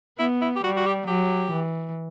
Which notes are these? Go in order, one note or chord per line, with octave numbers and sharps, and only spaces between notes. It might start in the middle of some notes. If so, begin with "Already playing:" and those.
B3 E4
E4
G4
G3 F#4
F#4
G4
F#3 G4
E3